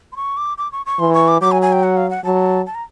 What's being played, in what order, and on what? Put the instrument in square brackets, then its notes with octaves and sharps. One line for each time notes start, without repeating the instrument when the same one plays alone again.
[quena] C6
C#6
D6
D6
C#6
C#6
[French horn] E3 [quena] C6
[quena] C#6
D6
[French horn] F#3 [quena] D6
[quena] G#5
G#5
G5
F#5
F5
F#5
[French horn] F#3 [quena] A5
[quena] A5
A#5